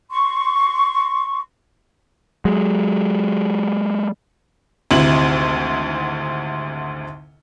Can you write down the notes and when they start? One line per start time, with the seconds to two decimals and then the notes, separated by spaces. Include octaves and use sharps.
0.11 C6 C#6
2.45 F#3 G#3
4.91 G#1 D2 C3 E4 F#7